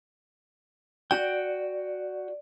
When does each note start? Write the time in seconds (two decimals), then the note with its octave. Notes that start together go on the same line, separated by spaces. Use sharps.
1.11 F#4 D5 G5